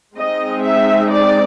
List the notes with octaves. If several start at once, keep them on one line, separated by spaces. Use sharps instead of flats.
G#3 C4 D#4 D#5
E5
D5